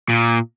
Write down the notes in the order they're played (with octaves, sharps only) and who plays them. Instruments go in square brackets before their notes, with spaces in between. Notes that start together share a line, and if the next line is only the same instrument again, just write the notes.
[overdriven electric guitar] A#2